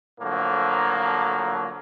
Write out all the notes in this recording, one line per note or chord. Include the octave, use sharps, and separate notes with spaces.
A2 D3 F3 F#3 A#3